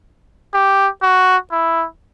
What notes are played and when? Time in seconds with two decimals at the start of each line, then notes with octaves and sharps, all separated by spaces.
0.54 G4
1.02 F#4
1.52 E4